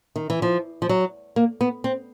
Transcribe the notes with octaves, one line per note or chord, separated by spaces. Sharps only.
D#3
E3
F3
F3
F#3
A#3
B3
C4